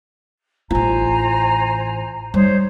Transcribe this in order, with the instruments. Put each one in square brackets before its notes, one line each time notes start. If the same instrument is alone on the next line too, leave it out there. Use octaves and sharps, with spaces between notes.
[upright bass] A1 F4 [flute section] C5 G#5 A#5
[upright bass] G3 [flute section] D#4 C5 C#5